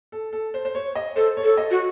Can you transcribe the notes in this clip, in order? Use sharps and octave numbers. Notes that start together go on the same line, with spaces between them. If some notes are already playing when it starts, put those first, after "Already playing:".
A4
A4
C5
C5
C#5
D#5
A4 C5
C#5
A4
D#5
F#4